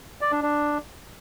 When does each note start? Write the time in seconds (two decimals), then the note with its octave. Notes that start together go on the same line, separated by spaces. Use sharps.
0.21 D5
0.32 D4
0.42 D4